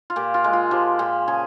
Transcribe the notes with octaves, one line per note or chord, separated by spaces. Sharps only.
F4
A#2 G4
F4
G#3
F4
F3 G4
A#2 G4
C#3 G#4